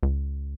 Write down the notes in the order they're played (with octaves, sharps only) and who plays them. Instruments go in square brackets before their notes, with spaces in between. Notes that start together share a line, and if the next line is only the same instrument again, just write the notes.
[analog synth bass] C#2